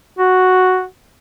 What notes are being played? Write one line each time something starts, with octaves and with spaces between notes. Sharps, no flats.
F#4